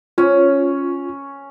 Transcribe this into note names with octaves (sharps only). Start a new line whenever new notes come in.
C#4 F4